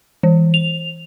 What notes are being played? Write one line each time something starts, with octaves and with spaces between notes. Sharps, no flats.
E3
F7